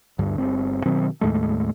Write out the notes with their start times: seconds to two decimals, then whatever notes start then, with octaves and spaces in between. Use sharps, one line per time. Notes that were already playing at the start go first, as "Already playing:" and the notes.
0.19 D2 G2
0.38 G1 C4
0.86 B2 D#3 F#3 C4
1.21 D#2 A2 G#3 A3